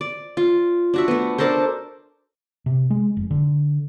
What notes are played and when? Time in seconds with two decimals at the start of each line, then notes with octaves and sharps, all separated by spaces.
0.01 D5
0.37 F4
0.94 D4 F#4 E5
1.08 A3 B3
1.38 D4 A4 A#4 C5
2.66 C3
2.90 G#3
3.17 F1
3.30 D3